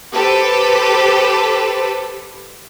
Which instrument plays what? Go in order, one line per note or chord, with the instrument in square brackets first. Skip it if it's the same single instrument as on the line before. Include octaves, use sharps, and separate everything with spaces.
[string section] G4 A4 B4 C5